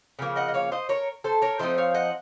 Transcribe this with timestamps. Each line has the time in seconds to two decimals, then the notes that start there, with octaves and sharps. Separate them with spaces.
0.19 C#3 F3 A#3
0.36 D#5 F#5
0.48 D#5
0.54 C#5 F5
0.72 C5 D#5
0.89 A#4 C#5
1.24 A4 C5
1.42 A#4 C#5
1.59 F3 A3 C4 D#4 C5 D#5
1.78 C#5 F5
1.94 D#5 F#5